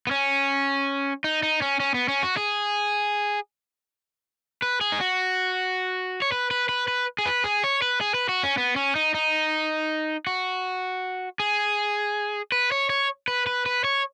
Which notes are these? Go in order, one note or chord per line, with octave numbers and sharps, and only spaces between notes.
B3
C#4
D#4
D#4
C#4
C#4
B3
C#4
F#4
G#4
B4
G#4
D#4
F#4
C#5
B4
B4
B4
B4
G#4
B4
G#4
C#5
B4
G#4
B4
F#4
C#4
B3
C#4
D#4
D#4
F#4
G#4
B4
C#5
C#5
B4
B4
B4
C#5